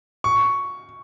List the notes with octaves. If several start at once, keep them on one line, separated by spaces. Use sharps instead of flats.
C#6